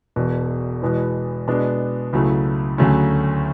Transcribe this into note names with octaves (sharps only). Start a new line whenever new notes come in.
E1 E2 B2
E2 B2 G#3 B3 E4
B2 G#3 B3 D4
C#2 C#3 F#3 A3 E4
D2 C#3 F#3 A3 C#4